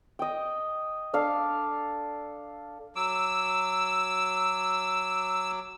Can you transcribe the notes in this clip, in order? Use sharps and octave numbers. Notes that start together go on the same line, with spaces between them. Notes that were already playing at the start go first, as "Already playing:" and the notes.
D#5 G5
D4 A4 F5 A5
F#3 D6 E6